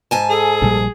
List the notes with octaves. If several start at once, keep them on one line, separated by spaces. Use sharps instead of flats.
G#2 G#5 A5
G#4 A4
A#1 A#2 G3